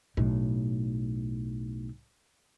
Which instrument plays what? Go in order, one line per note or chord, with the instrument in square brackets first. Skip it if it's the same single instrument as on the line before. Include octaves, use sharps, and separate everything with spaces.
[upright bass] B1 A2